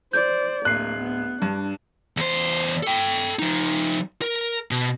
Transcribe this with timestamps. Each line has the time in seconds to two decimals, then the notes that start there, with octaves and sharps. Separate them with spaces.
0.13 C5 D5 G6
0.65 D1 A#3 F#6 C7
0.99 B3
1.42 G2 D4
2.17 E2 C5
2.83 A4 G5
3.39 F3 D#4
4.22 A#4
4.71 B2